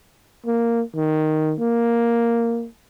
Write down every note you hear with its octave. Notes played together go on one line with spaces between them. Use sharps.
A#3
D#3
A#3